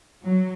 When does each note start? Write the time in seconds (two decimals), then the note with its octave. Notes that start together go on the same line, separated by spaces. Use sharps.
0.23 F#3